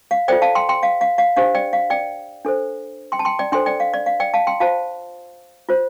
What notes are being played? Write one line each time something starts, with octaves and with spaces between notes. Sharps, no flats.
F5
F4 A4 C5 D5 G5
F5 A5
G5 C6
G5 C6
F5
F5
F5
D4 G4 C5 F5
D5 G5
F5
D5 G5
D4 A4 C5
G5 C6
A5
G5 C6
D5 G5
D4 A4 C5 G5 C6
D5 G5
F5
D5
F5
D5 G5
F5 A5
G5 C6
F4 C5 F5 A5
F4 C5